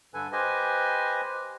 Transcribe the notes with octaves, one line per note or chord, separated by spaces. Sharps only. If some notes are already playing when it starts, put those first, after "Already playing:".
G2 D3 A4 B4 G#5
G4 B4 C5 D#5 G#5